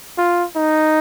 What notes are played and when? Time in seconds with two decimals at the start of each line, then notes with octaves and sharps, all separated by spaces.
0.18 F4
0.56 D#4